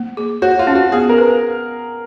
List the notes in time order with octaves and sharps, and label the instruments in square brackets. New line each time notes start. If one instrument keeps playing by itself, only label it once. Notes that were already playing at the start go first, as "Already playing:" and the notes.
Already playing: [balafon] A#3
G#4
[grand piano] F#4 [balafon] C#5
[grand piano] F4
[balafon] C#4
[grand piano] F#4
[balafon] B3 [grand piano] G#4
[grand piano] A#4
[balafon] B4